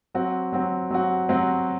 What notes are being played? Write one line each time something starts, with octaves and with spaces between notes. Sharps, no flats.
F#3 C4 F#4
F#3 C4 F#4
F#3 C4 F#4
F#3 C4 F#4